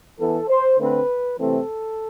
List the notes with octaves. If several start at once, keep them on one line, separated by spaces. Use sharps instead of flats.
E3 B3 A4
C5
D3 A3 C4 B4
C3 E3 A3 C4 A4